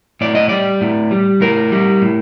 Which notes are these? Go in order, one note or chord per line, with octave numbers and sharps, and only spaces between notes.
A2 D5
D#5
G3 D5
A2
G3
A2 A#4
G3
A2